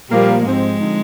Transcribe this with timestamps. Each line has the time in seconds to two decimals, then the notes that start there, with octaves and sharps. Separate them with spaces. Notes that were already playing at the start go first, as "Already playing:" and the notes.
0.11 A#2 F3 G3 A#3
0.45 G#2 F3 G#3 C4
0.80 D3 F3 C4 D#4